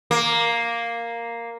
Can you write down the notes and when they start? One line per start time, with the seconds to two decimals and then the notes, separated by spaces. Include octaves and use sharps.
0.11 A#3